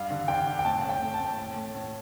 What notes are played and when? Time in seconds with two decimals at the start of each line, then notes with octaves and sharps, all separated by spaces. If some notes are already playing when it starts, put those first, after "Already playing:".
Already playing: G2 F5
0.10 D3
0.28 D3 G5
0.46 D3
0.59 G5
0.65 A2 A5
0.84 A2
0.89 G5
1.02 A2
1.14 A5
1.20 A2
1.38 A2
1.56 A2
1.75 A2